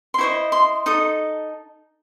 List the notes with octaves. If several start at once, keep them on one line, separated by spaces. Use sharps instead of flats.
C6
E4 C5 D#5 C#6
C6
D#4 A4 D#6